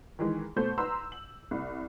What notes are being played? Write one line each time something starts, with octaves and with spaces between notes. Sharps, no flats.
D#3 E3 G#3
B2 A3 C5 G6
B4 A#5 C6 E6
F#7
C2